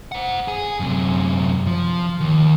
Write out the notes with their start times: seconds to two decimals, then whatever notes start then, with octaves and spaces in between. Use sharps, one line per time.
0.12 C5 F#5
0.48 G#4
0.80 F#2 C3
1.67 F3
2.21 D#2